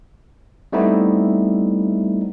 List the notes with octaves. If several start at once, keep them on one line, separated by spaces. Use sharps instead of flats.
G3 A3 B3 C4 D#4 E4